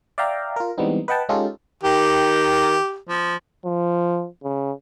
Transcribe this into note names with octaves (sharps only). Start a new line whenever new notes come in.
D5 E5 F5 G5 A#5
F4 A#4
E3 G3 G#3 B3 C4 D#4
B4 D#5 F#5 G5 A5
G#3 C#4 D#4 F4 G4 A4
D#3 G4
F3
F3
C#3